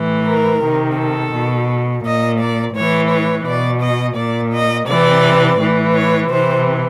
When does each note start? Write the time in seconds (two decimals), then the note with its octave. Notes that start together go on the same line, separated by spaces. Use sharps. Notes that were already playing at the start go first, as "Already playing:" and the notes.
Already playing: A2 E3
0.26 A#4
0.62 C3 D#3
0.97 A4
1.33 B2
2.04 A#2 D#5
2.40 D5
2.75 A2 E3 C#5
3.10 C#5
3.46 B2 D5
3.81 D#5
4.16 A#2 D5
4.52 D#5
4.87 C3 E3 D5
5.59 A2 E3
5.94 C#5
6.29 C3 E3 C5